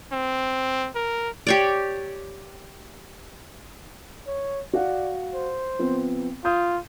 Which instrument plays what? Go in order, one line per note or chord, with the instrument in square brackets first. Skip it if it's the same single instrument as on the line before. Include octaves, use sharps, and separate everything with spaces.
[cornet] C4
A#4
[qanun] G4 C#5 D5
[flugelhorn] C#5
[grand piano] F#4 F5 F#5 [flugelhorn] D5
[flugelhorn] C5
[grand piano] F3 B3 C4
[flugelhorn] F4 [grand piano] D#6 G6